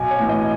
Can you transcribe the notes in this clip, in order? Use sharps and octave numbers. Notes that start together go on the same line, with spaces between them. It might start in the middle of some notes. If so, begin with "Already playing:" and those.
Already playing: B1 G#5
C#5
A2 E3
D#5